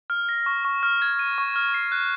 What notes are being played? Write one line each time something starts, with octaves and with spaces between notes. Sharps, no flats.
F6
A#6
C#6
C#6
F6
G#6
D#7
C#6
F6
C7
F#6